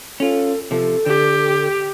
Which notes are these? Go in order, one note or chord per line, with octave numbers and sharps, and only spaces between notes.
C#4 F4 A4
C3 F3 A4
D3 G4